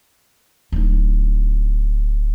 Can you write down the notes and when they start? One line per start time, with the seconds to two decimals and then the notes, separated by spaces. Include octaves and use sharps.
0.72 D1 D#4